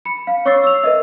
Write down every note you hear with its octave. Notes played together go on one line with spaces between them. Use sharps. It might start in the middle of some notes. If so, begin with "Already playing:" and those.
B5 C#7
F5
C#5 C#6 D6 E6 A6 C7
E6 F7
A#4 B4 D#5 E5